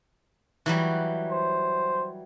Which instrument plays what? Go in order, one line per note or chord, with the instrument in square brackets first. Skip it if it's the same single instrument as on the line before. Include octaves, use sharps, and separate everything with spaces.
[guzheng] E3 F#3 G3
[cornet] C5